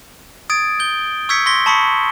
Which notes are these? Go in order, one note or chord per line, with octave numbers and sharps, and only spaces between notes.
D#6 G#6 A6 D7
G6 G7
C#6 E6 G6 G#6 B6 C#7
C6 C#6 A#6 B6 G7
A5 B5 C#6 D#6 B6 C#7